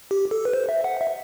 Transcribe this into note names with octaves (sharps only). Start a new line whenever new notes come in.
G4
A4
B4
C5
E5
F#5
E5